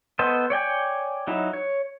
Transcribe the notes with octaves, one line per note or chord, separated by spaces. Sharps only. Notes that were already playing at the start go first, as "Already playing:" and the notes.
B3 A4 C5 D#5
C#5 D5 G5 G#5
F#3 D#4 E4
C#5